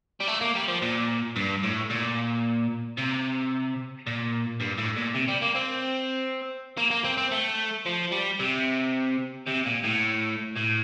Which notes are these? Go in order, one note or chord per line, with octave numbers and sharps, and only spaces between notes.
G3
A3
A#3
G3
F3
A#2
G2
A2
A#2
C3
A#2
G2
A2
A#2
C3
G3
A#3
C4
A#3
A#3
C4
C4
A3
F3
G3
C3
C3
A#2
A2
A2